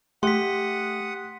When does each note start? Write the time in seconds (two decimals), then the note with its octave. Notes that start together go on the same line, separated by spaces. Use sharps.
0.23 A3 G4 F#5 C6 D#6 B6